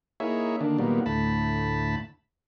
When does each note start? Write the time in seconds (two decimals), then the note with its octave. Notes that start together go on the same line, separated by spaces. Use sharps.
0.20 A#3 D#4 E4 G#4 C#5 E5
0.61 D3 D#3 A#3 D4
0.78 A#2 D#3 F#3 G3 A#3 B3
1.06 D2 A2 A5 B5